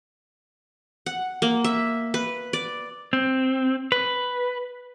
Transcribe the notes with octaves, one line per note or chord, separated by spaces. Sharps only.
F#5
A#3
E5
B4
D5
C4
B4